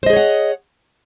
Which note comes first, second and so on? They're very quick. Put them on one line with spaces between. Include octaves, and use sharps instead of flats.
C5 D#5 G#4 C#5 F#5